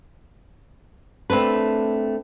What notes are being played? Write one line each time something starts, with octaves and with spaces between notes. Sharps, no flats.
A3 C4 D4 B4